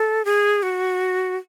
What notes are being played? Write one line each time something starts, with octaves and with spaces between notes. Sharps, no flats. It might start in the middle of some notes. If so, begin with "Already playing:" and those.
Already playing: A4
G#4
F#4